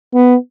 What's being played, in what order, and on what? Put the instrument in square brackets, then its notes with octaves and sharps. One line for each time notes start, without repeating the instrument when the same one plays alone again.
[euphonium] B3